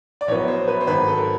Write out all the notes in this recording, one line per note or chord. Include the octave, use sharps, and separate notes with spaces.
D5
A#1 A2 F#3 B3 C#5
C5
B4
C5
G#1 G#2 D#3 F#3 B4
A4
A#4